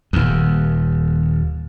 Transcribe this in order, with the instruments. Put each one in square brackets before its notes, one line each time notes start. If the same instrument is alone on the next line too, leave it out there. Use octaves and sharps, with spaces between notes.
[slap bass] D#1 D#2